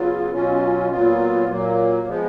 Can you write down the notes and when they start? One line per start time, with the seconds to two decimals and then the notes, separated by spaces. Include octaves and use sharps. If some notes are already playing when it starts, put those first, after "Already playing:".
Already playing: C#3 F#3 B3 F4
0.32 B2 F#3 C#4 F4
0.90 A#2 F#3 B3 F4
1.49 A#2 F#3 A#3
2.08 F3 G#3 B3